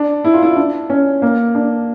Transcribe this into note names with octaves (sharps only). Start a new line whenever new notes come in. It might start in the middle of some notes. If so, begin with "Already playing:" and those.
Already playing: D4
E4
F4
E4
D4
C#4
A#3
D4